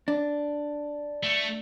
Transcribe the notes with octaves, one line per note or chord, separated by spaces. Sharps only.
D4
A3